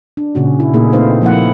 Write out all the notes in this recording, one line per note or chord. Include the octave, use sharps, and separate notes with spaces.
D4
A#2 C#3 C#4 F#4
E4
A#2 A3 A#3 D#4 G#4
A3 C4 D#4 B4 C5 F5
F3 A#3 E4 F#5